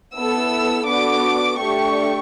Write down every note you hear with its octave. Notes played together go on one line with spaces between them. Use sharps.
B3 E4 A4 E6
B3 D4 F#4 A4 D6
A3 D4 G4 C#6